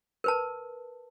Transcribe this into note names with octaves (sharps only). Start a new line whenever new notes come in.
A#4 B4 A5